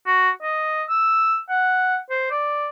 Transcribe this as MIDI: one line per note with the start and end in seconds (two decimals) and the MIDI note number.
0.06 0.30 66
0.42 0.83 75
0.89 1.38 88
1.50 1.97 78
2.10 2.28 72
2.31 2.70 74